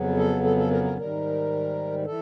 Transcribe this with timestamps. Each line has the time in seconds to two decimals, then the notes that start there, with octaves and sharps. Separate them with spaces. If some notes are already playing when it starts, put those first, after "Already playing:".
Already playing: F2 C#3 F#3 B3
0.17 A4
0.44 A4
0.57 A4
0.71 A#4
0.84 A#4
0.98 G#2 D#3 G3 A#4
2.06 E3 A4